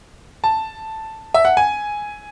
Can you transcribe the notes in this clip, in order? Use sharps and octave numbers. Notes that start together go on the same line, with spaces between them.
A5
E5
F#5
G#5